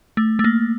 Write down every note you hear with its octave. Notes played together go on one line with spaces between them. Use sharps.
A3
A3
A#3